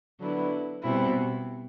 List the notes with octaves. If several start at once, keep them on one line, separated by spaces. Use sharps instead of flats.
D3 F#3 B3 E4
B2 G3 C4 E4